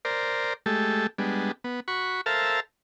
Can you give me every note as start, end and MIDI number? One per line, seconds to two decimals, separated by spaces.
0.05 0.53 70
0.05 0.53 72
0.05 0.53 74
0.66 1.07 56
0.66 1.07 57
0.66 1.07 67
0.66 1.07 69
1.18 1.52 55
1.18 1.52 56
1.18 1.52 59
1.18 1.52 62
1.64 1.80 59
1.88 2.21 66
1.88 2.21 83
1.88 2.21 85
2.26 2.60 69
2.26 2.60 70
2.26 2.60 72
2.26 2.60 76
2.26 2.60 77
2.26 2.60 81